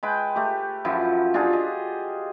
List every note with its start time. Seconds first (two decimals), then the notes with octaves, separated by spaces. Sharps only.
0.03 G#3 B4 G5
0.35 A3 G4
0.85 F#2 F3 E4
1.34 D4 F4 G4 G#4
1.53 D#5